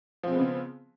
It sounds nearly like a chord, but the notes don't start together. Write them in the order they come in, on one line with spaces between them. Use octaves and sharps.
F3 C4 G#3 B3 C#3